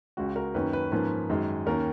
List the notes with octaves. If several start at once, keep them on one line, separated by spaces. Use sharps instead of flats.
C#2 C#3 G#3 F#4
A#4
F#2 D#3 A#3 C#4 B4
B4
G#2 F3 A#3 C#4 B4
F#2 D#3 G#3
D#2 D#3 A#3 C#4 A#4